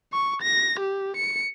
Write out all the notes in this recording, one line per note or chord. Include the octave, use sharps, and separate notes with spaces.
C#6
A#6
G4
C#7